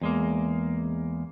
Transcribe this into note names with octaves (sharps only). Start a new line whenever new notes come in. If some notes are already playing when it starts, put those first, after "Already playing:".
E2 G#3 A#3